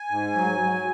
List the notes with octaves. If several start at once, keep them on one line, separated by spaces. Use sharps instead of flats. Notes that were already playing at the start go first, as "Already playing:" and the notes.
Already playing: G#5
G#2
F#3
F#3